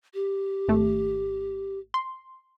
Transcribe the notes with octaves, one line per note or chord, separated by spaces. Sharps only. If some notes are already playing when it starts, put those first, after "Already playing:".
G4
G#1 A3
C6